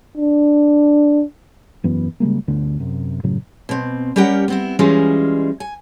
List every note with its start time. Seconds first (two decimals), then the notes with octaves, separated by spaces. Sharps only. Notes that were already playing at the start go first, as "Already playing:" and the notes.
0.17 D4
1.83 E1 F#2 E3 B3
2.20 C#3 G3 G#3 A#3
2.47 G1 D2 D3 A3
2.80 F#2 C3
3.23 F#2 A2 C#3 F#3
3.69 B2 C4
4.16 G3 C#4 G4 A#4 F#5 G5
4.48 B3 C4 E4
4.79 E3 G3 G#3 C#4 F4
5.60 G#5